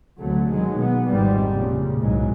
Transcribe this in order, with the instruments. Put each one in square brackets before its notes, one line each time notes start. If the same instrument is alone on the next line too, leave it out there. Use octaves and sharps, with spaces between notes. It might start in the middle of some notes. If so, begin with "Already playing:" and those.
[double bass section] D2 C3 F#3 A3
B2 D#3 F#3 G#3
B3
G#1 F2 G#2 D#3 G3
A#2 C#3
C2 G#2 F#3 G#3